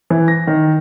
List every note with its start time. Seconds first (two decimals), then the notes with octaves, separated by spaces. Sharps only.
0.10 E3
0.28 A#6
0.47 D#3